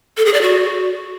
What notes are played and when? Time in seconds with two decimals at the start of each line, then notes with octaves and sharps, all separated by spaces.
0.17 A4
0.25 G#4
0.34 D5
0.42 F#4